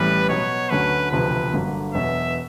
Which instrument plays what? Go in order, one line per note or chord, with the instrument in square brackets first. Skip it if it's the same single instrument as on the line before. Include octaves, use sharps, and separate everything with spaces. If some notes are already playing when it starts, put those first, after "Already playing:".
Already playing: [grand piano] A1 A2 E3 G3 [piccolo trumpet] B4
[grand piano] B2 F#3 B3 [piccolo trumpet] C#5
[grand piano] D2 D3 F#3 A3 C#4 [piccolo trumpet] B4
[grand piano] E1 D2 C3 F3 [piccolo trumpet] B4
[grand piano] G1 G2 D3 F#3 A#3
[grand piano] E1 E2 B2 F#3 [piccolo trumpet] E5